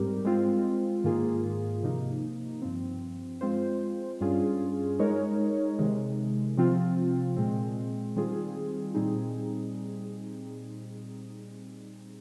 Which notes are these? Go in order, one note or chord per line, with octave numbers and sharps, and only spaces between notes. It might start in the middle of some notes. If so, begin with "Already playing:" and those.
Already playing: G#2 G3 C4 G4 A#4
G#3 C4 F4
G#2 D#3 A#3 F4 G#4
C3 F3 A#3 D#4
G2 F3 C4
G#3 C4 F4 C5
G2 G3 C#4 F4 G#4
G#3 D#4 A#4 C#5
C3 D#3 G#3
C3 F3 C4 F4
A#2 G#3 C4
D#3 G3 C4 F4 G#4
A#2 G3 C4 D#4 G#4